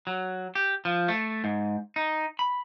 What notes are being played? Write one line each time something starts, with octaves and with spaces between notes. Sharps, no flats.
F#3
G4
F3
A3
G#2
D#4
B5